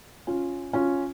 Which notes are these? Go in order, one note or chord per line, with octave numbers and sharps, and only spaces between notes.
C#4 F4
C#4 F4